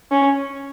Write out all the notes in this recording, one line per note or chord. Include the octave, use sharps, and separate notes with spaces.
C#4